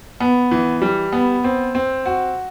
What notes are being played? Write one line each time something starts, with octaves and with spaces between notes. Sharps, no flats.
B3
E3
G3
B3
C4
C4
F#4